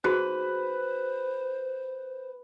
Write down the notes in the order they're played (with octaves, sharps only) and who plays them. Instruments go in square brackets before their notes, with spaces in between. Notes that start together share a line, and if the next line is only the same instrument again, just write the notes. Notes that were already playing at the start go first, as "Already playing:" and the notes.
[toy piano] D#4 F#4 G#4 [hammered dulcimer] B4 [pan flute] C5